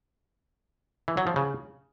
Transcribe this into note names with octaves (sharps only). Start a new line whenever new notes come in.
E3
F#3
F3
C#3